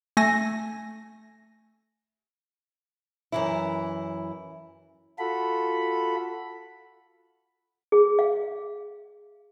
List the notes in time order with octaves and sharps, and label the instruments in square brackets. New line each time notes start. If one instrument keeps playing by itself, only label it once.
[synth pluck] A3 G#5 A#6
[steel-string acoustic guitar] F#2 E3 E4
[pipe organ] F4 F#4 A4 B5
[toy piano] G#4
F5